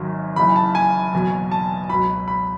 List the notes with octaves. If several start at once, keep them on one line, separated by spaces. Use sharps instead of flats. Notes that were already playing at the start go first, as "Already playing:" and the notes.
Already playing: G#1 F#2 D#3 F#3
F#1 F#2 C#3 E3 B5
A5
G#5
F#1 E2 B2 F#3
A5
C#2 B2 F#3 B5
B5